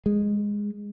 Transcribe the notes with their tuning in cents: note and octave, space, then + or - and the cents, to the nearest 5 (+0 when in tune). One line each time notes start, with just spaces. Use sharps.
G#3 -10